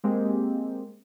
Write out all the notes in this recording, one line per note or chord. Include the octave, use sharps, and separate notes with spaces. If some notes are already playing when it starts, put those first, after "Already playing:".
G#3 A#3 C4 G4